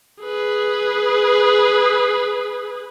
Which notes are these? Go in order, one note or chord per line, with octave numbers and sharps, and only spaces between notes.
G#4 B4